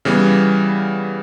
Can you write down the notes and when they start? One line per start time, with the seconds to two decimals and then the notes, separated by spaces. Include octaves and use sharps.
0.05 C#3 E3 G3 B3